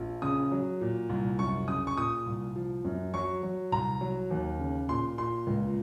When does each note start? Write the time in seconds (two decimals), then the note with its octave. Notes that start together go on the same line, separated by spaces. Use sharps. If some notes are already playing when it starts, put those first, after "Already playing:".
Already playing: A#1
0.22 C#3 D#6
0.52 F#3
0.81 A#2
1.09 C2
1.39 F#2 C#6
1.68 C#3 D#6
1.87 C#6
1.97 A#2 D#6
2.26 C2
2.56 F3
2.84 F#2
3.14 F#3 C#6
3.43 F#3
3.72 C2 A#5
4.01 F#3
4.31 D#2
4.59 C#3
4.89 A#2 C6
5.18 A#2 C6
5.47 C#2